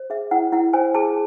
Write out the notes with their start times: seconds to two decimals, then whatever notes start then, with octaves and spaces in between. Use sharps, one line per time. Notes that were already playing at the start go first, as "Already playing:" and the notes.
Already playing: C5
0.10 G#4 E5
0.31 E4 F#5
0.52 E4 F#5
0.73 C5 G#5
0.95 G#4 A5